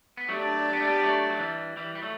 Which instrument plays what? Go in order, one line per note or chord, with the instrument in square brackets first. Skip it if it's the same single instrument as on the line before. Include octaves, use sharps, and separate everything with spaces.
[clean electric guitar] B3
[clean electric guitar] F#3 A3 [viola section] D4 G4 D5
[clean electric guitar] B3
A3
G3 B3
F#3 A3
F#3
E3 G3
E3 G3
G3
F#3 A3